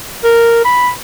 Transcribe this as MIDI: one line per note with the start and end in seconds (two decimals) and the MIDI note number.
0.24 0.64 70
0.65 0.91 83